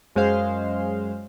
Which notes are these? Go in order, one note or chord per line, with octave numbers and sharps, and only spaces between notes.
F#2 G#3 C#4 C5 F5